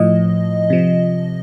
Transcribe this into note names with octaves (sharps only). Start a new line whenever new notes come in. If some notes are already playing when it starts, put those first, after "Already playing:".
Already playing: A2 F3 D#5
C3 F3